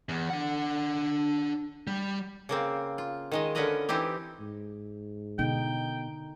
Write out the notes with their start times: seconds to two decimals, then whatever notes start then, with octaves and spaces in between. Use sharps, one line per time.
0.09 E2
0.30 D4 F#5
1.87 G3
2.49 C#3 A#3 C4
2.98 F4
3.32 D#3 G#3 D#5
3.55 D3 C#4 A#4 B4 D#5 A#5
3.89 E3 C4 D#4 E4 G4
4.40 G#2
5.39 B2 D3 D#4 G5